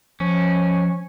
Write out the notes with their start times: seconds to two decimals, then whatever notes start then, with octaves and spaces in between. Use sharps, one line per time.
0.20 F3 C#4